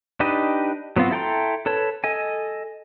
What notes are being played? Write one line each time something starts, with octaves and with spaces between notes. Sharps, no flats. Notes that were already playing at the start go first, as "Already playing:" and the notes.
D4 D#4 G4 B4 D#5
F#3 B3 C4 F4 F#4
E4 A4 G5 A#5 C6
A4 B4 C#5 A5
A4 D#5 G#5